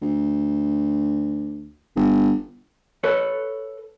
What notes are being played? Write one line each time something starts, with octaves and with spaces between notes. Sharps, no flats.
D2
G1
A4 B4 C#5